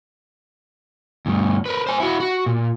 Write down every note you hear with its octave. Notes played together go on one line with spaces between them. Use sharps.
D2 G2
A#4 B4
C5 G#5
E4 F#4
F#4
A#2